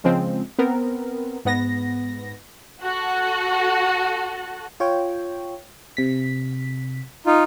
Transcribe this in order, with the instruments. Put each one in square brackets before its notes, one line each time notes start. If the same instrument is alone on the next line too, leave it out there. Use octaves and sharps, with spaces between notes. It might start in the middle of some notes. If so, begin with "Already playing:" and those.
[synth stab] C#3 F3 G#3 C4
B3 C4 A#4
G#2 B3 A#6
[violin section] F#4 A4
[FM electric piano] F4 C#5 G5
C3 B6
[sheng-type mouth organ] D#4 F4